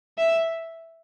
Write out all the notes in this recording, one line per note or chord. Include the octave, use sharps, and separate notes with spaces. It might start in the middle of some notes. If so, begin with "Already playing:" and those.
E5